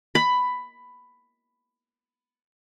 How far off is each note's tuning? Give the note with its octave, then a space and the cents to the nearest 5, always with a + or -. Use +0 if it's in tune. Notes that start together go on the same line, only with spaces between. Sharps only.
B5 +10